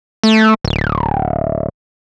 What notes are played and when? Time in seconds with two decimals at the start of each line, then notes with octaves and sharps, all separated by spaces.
0.23 A3
0.65 D1